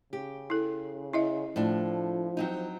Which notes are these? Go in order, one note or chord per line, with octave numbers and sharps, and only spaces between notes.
C#3 G4
E4 A4
E4 D#5 E5
A2 F3 D4
F#3 C4 D#4